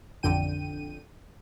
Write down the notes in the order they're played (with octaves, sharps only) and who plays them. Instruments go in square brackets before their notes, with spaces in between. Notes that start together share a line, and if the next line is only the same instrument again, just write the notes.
[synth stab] A1 F2 D3 G5 D#7